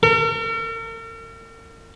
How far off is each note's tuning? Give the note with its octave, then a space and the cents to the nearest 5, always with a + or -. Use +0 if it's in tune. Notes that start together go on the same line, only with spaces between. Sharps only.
A#4 -45